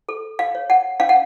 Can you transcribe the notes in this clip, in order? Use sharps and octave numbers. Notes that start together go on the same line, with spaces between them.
A4
F5
C#5
F#5
C#4 F5
F#5